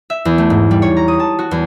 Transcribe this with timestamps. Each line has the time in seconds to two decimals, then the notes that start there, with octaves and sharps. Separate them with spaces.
0.10 E5
0.25 E2
0.38 A3
0.50 G#2
0.71 G3
0.82 C#5
0.97 A#5
1.08 D#6
1.20 A5
1.39 F#4
1.51 E2